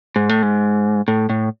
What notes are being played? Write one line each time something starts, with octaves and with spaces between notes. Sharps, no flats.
G#2
A2
G#2
A2
A2